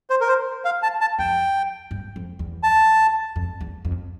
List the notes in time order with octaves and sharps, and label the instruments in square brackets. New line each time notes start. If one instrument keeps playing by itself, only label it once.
[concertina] C5
A#4
C5
F5
A5
A5
[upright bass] F2 [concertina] G5
[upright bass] G2
F2
E2
[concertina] A5
[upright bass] F2
E2
F2